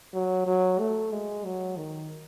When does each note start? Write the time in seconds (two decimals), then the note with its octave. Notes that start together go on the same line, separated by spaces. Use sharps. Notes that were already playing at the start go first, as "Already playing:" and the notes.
0.14 F#3
0.47 F#3
0.79 A3
1.12 G#3
1.45 F#3
1.77 D#3